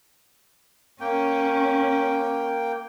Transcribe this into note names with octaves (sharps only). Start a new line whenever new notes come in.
A#3 C#4 G5